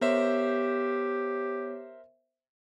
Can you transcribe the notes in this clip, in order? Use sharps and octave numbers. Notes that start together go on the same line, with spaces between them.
B3 G4 A#4 C5 C#5 E5